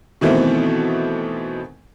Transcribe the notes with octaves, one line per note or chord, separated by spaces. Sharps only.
B2 D#3 E3 A3 B3 C4